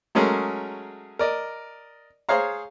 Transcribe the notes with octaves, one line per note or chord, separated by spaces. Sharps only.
F#3 G#3 A3 C#4 G#4 A#4
A#4 D5 D#5
G#4 C5 C#5 F5 A#5